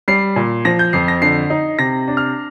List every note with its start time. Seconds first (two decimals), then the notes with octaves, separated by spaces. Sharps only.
0.08 G3 C7
0.36 A#2
0.65 F3 A#6
0.79 G6
0.93 F2 C7
1.08 A#6
1.22 D3 C7
1.50 D#4
1.79 C3 A#6
2.08 D4
2.17 F6